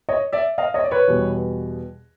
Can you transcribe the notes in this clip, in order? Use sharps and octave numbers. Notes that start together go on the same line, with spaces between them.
C#5 D#5
D5 E5
D#5 F5
C#5 D#5
D5
B4 C#5
E2 B2 G3